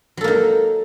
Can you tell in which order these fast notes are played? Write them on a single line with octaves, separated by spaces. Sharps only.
F#3 A4 A#3 D#4